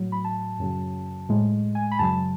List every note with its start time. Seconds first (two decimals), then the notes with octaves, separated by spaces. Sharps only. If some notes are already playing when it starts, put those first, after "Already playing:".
Already playing: A2 F#3
0.12 B5
0.24 A5
0.59 F#2 C#3 F#3
1.29 A2 G#3
1.75 G#5
1.91 B5
1.99 F#2 C#3 F#3 A5